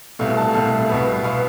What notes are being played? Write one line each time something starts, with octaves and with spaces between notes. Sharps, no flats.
C2 B2 A3 F5
A5
C2 B2 A3 F5
C2 B2 B3
B2 B3 F5